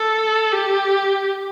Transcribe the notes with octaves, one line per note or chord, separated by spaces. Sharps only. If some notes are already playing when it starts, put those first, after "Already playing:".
Already playing: A4
G4